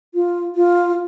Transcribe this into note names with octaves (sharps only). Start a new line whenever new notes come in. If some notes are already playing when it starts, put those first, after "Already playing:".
F4
F4